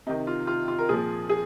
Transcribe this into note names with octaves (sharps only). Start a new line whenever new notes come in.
C3 D#3 D#4
F4
F4
F4
A#4
A#2 F3 G#4
G#4